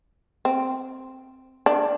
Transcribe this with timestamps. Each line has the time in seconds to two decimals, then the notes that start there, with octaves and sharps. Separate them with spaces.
0.45 C4
1.66 D4